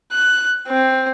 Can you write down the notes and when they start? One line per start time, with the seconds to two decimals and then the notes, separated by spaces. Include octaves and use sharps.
0.13 F#6
0.68 C4